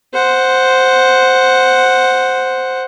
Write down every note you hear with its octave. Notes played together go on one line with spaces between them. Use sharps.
C5 F#5